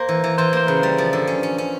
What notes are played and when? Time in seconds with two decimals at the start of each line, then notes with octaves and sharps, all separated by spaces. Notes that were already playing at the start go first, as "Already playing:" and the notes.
Already playing: A#3 C5
0.09 E3
0.24 E3
0.38 E3 C5
0.53 A#3 C5
0.67 C#3 B4
0.83 G3
0.98 F3
1.13 D3
1.27 C#4
1.43 C#4
1.58 C#4